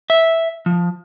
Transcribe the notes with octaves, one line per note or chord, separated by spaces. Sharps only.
E5
F3